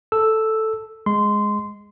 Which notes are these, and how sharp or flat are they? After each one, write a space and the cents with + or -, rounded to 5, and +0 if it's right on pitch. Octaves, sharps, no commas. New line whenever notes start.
A4 +0 E6 +0
G#3 +0 C6 -15